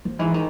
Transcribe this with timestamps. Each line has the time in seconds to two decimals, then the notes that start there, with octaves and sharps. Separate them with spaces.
0.05 F3
0.19 G#2 E3
0.34 D#3